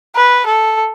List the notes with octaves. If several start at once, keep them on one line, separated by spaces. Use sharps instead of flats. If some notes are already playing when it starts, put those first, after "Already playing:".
B4
A4